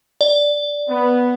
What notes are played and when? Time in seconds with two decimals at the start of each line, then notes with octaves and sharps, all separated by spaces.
0.21 D5
0.90 B3